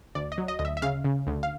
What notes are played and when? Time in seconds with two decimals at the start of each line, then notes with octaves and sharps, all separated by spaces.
0.15 D2 D5
0.32 D#5
0.38 F#3
0.48 D#5
0.59 D2 D#5
0.65 E5
0.77 E5
0.82 C#3 F5
1.05 C#3
1.27 D2
1.43 F5